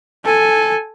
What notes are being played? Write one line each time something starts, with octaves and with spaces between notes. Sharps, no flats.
A4 G#5